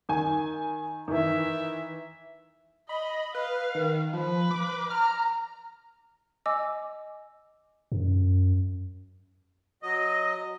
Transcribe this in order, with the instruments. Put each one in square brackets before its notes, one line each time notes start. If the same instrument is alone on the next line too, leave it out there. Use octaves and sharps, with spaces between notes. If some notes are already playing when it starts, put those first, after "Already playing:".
[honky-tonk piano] D#3 G#5
[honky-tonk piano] D#3 E3 [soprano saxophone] E5
[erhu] D#5 [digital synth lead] B5
[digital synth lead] B4 [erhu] F5
[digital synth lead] D#3
[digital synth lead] F3 [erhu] B4
[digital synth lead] D6
[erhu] A#5 [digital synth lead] F6
[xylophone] D#5 G#5 D6 E6
[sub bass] F#2
[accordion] F#3 D#5